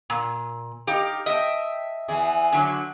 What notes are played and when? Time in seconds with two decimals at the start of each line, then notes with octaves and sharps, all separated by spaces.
0.10 A#2
0.87 D#4 G4 A#4 F5
1.26 D#5 E5 G5 A5
2.08 E2 E3 G#4
2.52 D3 F#3 D4